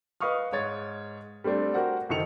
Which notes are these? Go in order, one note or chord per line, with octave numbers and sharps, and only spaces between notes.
B4 D#5 F5 C#6 D#6 F6
G#2 C#5 A6
G3 A3 C4 D4
F#4 G4 A#4 C5 F#5
F#1 D#3 A4 C#7 F7